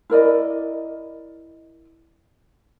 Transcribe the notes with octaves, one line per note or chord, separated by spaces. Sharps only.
E4 A#4 D5 D#5